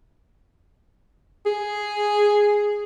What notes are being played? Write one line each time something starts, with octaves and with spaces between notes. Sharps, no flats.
G#4